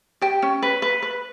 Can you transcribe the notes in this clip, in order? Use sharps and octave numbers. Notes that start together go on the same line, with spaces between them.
G4 G5
C#4
B4
B4
B4